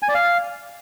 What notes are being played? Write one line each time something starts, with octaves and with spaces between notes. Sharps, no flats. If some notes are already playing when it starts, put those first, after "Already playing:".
G#5
D5
F5